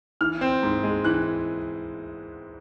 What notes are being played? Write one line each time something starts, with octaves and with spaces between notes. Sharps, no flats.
E3 F6
C4
G#2
G#3
E3 F#6